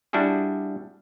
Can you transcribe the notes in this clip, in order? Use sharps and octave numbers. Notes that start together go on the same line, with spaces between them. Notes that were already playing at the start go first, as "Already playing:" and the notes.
G3 D4 E4 F#4 G#4